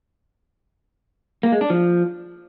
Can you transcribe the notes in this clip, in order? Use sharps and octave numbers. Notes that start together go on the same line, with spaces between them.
A#3
G#3
D4
F3